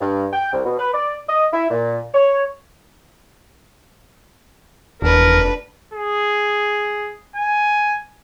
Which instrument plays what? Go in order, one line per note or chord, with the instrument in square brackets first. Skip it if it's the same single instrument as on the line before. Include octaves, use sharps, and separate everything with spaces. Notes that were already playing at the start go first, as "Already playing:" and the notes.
[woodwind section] G2
G5
C2
B2
B4
D5
D#5
E4
A#2
C#5
[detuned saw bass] F1 [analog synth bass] E2 [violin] D4 B4 [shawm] A#4
[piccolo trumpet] G#4
G#5